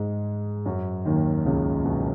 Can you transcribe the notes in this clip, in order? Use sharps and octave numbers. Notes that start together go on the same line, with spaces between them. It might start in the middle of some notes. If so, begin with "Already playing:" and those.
Already playing: G#2 G#3
F#2 F#3
D#2 D#3
C#2 C#3
B1 B2